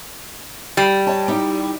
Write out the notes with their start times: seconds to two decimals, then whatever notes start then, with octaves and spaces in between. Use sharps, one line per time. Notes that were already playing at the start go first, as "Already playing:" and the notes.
0.77 G3
1.07 C#5 D#5 A5
1.28 D#4 E4 G4